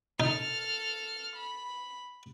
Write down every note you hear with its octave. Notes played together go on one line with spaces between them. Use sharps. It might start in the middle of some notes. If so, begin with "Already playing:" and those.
D#4 A4 F6
B5